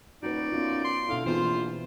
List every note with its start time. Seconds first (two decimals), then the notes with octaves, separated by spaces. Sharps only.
0.23 D#1 D#4 F#4 B4 D5
0.52 F#2 B3 C#4 F4
0.84 C6
1.09 B2 D3 E4 F5
1.26 G#1 E3 B3 F4 C5
1.40 A#1